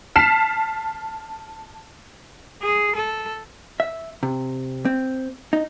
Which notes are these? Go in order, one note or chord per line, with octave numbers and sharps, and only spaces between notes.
A5 F6 B6 C7 E7
G#4
A4
E5
C3
C4
D#4